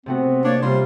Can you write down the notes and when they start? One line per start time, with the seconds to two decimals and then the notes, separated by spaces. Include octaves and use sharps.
0.06 C3 A3 B3 C4 F#4
0.44 A#3 D4 C#5 D5
0.62 C3 G3 A#3 F4 C5